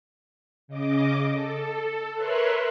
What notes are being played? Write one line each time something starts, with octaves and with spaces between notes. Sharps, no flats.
C#3 D#5 D6
A4
A#4 B4 C#5 E5 C6 F#6